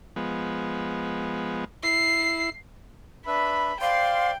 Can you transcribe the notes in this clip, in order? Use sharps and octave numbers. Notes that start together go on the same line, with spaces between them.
F3 G#3 B3
E4 C7
D4 B4 E5 B5
C5 D5 F5 G5 C6